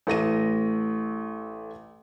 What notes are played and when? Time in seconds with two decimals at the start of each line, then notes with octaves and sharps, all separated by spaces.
0.07 A1 A3 A#6 D#7